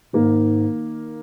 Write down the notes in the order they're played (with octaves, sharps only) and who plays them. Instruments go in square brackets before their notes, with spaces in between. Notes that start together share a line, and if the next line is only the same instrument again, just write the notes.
[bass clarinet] G#2 [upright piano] D#3 A#3 D#4 A#4